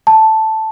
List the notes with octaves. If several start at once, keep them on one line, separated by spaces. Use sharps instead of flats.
A5